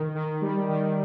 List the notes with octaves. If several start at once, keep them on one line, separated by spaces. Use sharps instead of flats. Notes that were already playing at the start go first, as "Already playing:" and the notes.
Already playing: D#3
D#3
G3
D#3